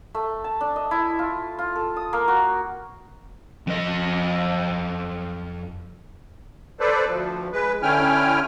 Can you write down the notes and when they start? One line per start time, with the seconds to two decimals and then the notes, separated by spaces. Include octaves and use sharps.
0.15 A3
0.44 A5
0.61 D4
0.76 D#5
0.91 E4
1.19 F4
1.59 F4
1.75 A4
1.96 D#6
2.13 A#3
2.28 F#4
3.67 F2 D#5
6.80 A4 B4 C5 D5
7.08 D2 F3
7.53 G#3 B4
7.82 D3 C#4 E4 G5 G#5 F6